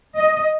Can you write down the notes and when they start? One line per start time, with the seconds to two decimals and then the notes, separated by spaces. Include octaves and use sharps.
0.17 D#5